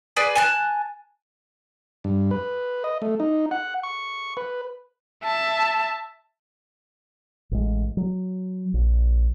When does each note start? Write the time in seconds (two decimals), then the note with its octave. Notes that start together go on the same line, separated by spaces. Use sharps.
0.16 G#4 B4 D5 G#5
0.35 G#5 A5 F#6
2.04 G2
2.31 B4
2.84 D#5
3.02 A3
3.20 D#4
3.51 F#5
3.83 C#6
4.37 B4
5.24 E5 A5
7.51 A1 G#3
7.97 F#3
8.74 A#1